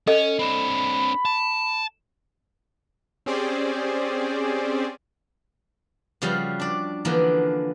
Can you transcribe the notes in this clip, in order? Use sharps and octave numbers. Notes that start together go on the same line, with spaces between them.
C#4 A4 D#5
C4 D4 B5
A5
C4 C#4 G4 G#4 C5 D5
C#3 F3 G3 F#4 F5
D4 D5
D3 E3 F3 A#3 B3 D4